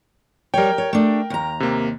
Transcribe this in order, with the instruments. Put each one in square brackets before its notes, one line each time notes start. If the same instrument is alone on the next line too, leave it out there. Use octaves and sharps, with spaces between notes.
[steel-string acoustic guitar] G3 C#5 [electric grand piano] A#4 G5
[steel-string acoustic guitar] C#5
A3 D4
D#2 A#5
[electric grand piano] C3 A#3